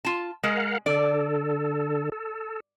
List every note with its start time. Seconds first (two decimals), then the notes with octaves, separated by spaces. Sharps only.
0.05 F4 A5
0.43 G#3 A#4 F5 F#5
0.86 D3 A4 D5
2.12 A4